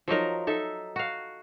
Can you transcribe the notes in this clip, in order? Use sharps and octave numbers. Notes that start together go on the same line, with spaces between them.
F3 F#3 D#4 A#4
D#4 A4 E5
F#4 F5